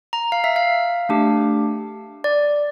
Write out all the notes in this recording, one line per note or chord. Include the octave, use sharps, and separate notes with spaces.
A#5
F5
E5
F5
A3 D4 G4
D5